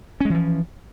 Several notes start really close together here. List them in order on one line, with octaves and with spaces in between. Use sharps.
C#4 G#3 E3 F3